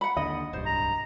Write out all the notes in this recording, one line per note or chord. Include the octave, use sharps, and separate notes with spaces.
F#5 B5
D#2 D3 D#5
D1 C2 G2 C5
A#5